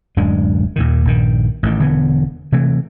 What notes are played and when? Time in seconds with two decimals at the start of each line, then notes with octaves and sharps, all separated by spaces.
0.17 D1 F#2 G#3 D4
0.76 D#2 A#2 D#3
1.05 A#1 G2 D#3
1.63 A1 A2 D3 D#3
1.79 E1 D3 E3 B3
2.52 C3 E3 A3